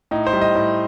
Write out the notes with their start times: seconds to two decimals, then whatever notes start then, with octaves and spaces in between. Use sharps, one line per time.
0.11 A2 D#4
0.27 C5
0.33 G3
0.41 D#5
0.55 A2